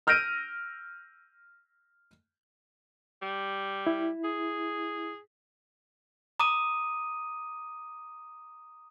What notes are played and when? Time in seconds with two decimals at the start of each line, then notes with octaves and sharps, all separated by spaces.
0.07 E6 F6 G6 A#6 D7 D#7
3.22 G3
3.87 E4
4.24 G#4
6.40 A#5 D6 D#6 D#7